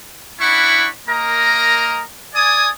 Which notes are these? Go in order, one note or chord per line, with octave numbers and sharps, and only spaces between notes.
C#4 D4 E4 F#5 B5 C#6
A#3 A#4 D#5 A#5
D5 G#5 D#6